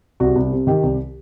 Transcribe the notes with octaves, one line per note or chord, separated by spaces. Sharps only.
C2 F#4
C2
C3
D#3 G4
C2